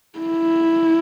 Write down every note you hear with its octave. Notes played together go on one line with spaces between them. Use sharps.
E4